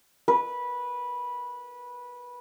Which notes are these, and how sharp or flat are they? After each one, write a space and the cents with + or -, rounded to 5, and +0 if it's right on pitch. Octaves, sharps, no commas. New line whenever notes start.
B4 -15